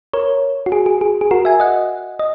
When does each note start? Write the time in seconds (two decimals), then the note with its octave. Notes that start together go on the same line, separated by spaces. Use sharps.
0.13 A#4 C#5
0.66 F#4
0.72 G#4
0.86 G#4
1.01 G#4
1.21 G#4
1.31 F#4 A#4
1.45 E5 G#5
1.60 D#5 F#5
2.19 D#5